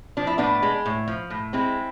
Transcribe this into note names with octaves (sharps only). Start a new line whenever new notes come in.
F3 D4
E4
A2 B3 D4
G#3
A2
F3
A2
G#3 C4 E4